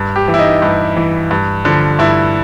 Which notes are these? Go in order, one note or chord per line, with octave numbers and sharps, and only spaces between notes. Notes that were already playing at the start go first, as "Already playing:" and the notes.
Already playing: G2
G4
E3
E4
D#4
G2
E3
G2
D3 F3
G2 E4